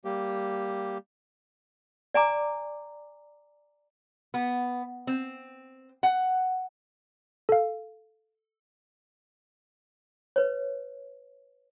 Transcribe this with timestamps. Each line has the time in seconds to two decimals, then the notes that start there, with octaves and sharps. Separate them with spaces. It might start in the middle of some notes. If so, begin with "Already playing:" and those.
0.05 G3 A#3 G4
2.14 D5 G#5 A#5 D6
4.34 B3
5.07 C4
6.03 F#5
7.49 A4 F5
10.36 B4 C#5